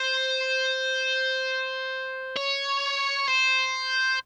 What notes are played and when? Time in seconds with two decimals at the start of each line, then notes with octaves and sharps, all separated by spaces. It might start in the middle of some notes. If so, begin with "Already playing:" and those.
Already playing: C5
2.36 C#5
3.28 C5